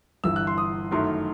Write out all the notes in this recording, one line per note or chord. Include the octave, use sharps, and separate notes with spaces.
G1 G2 E3 E6
F#6
C6
D#6
F#2 D#3 F#3 A3 E4 C6